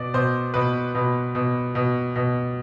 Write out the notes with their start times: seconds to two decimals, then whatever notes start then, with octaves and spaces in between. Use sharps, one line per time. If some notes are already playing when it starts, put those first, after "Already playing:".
Already playing: B2 D5
0.14 B2 C5
0.54 B2 B4
0.95 B2
1.35 B2
1.75 B2
2.16 B2